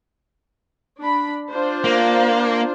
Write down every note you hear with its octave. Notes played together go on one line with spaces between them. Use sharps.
D4 B5
D4 F4 C5
A#3